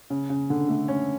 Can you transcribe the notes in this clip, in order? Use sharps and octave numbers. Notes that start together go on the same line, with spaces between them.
C#3
C#3
D3
A3
C#4